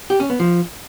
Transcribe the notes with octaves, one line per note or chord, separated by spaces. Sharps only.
G4
C#4
B3
F3